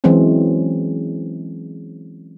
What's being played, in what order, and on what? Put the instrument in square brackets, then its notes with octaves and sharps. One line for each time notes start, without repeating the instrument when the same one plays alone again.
[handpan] E3 F#3 G#3 C4 C#4